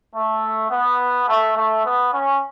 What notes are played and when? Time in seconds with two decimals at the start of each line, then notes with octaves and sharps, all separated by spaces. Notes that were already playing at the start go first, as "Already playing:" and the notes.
0.14 A3
0.70 B3
1.28 A3
1.56 A3
1.85 B3
2.13 C#4